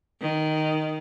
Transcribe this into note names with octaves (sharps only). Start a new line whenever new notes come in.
D#3